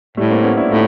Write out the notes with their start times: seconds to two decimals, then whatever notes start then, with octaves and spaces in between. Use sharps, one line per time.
0.17 A2 G3 A3
0.30 A#3 C4
0.43 B3 C#4
0.57 D4 E4
0.71 A2 D#4 F4